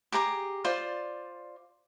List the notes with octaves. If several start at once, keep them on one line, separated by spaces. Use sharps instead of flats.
G4 G#4 A#5 D6
F4 C5 D5